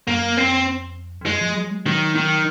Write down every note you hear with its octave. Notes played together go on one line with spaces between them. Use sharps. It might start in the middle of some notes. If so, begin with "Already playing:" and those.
F#2 A#3
F2 C4
F2
F#2 G#3
F3
F#3
G#3
D#3 F#3
D#3